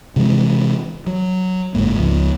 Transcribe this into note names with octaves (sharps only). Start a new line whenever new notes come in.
C3 E3 G#3
F#3
F#1 G#2 A#3
C#2 F3